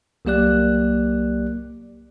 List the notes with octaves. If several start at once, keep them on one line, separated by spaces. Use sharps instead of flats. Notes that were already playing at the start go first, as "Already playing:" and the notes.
C2 F#3 A#3 G4 D5 F#6